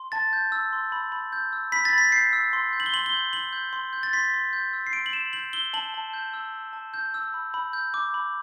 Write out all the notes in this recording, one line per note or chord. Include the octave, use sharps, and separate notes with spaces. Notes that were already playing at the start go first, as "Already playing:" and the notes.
Already playing: C6
A5 A6
G6
E6
C6
B5
B5
G6
E6
B5 B6
A6
B5 B6
G6 C7
E6
C6
G6
F#7
G7
C6 F#7
G7
G6
C6 F#7
G6
C6
G6
A6
C6 B6
C6
G6
E6
C7
C6 D7
F#7
C6 E7
G6 F#7
E6 G7
A5 F#7
A5
G6
E6
A5
A5
G6
E6
B5
B5
G6
D6
B5